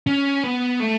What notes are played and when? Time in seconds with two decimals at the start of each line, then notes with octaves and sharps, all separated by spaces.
0.07 C#4
0.44 B3
0.80 A3